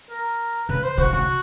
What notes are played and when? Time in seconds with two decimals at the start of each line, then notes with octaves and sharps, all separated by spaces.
0.10 A#4
0.68 C#3 B4
0.83 C5
0.98 C#3 F#4
1.13 C#3 F#4